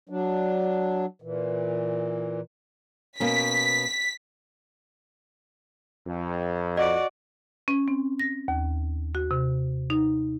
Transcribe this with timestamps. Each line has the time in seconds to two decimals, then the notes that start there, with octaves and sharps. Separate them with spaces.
0.09 F#3 D4
1.22 A#2 E3
3.20 B2 A#3 C#4 B6
6.07 F2
6.77 F#4 D5 D#5
7.68 C#4
7.88 C4
8.19 A#6
8.48 D#2
9.15 F#4
9.31 C3
9.90 D#4